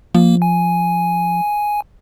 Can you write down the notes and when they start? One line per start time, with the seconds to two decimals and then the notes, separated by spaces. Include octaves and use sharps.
0.14 F3 A#3
0.42 G#5